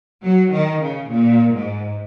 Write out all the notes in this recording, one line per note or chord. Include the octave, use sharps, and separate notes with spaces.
F#3
D#3
C#3
A#2
G#2